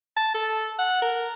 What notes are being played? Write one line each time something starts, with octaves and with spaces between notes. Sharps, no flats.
A5
A4
F#5
A#4